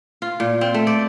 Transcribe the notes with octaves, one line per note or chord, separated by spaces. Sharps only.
F4
A#2
C4
A3
D5